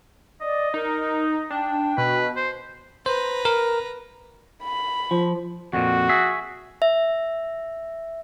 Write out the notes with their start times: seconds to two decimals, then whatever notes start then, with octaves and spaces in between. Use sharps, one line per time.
0.42 D5 D#5
0.74 D#4 A#4
1.50 D4 G5
1.98 B2 B4
2.36 C5
3.06 B4 C5 A#5
3.45 A#4
4.64 B5
5.11 F3
5.73 F2 A#2 F#4
6.09 G#4 E5
6.82 E5